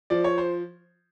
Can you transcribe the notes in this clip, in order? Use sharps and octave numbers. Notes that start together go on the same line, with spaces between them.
F3 D5
C#5
C5